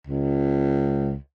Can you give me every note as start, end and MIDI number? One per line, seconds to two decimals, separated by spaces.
0.07 1.16 37